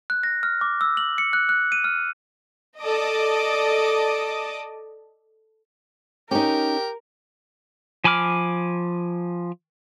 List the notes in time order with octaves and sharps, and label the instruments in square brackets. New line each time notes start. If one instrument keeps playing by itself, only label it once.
[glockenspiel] F#6
A#6
F6
D6
E6
F#7
C#7
F#6
F#6
D#7
F6
[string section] A4 D5 D#5 A5 D6 D#6
[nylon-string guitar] C#4 D#4 [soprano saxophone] G4 [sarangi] A#4
[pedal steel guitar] F3 G#5 B5 D6 F6